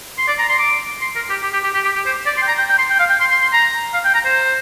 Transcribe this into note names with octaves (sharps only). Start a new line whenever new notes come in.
C6
D5
A#5
C6
D6
C6
A#4
G4
G4
G4
G4
G4
G4
G4
C5
D5
C6
G5
A#5
G5
G5
C6
G5
F5
G5
C6
C6
C6
A#5
F5
G5
A#5
C5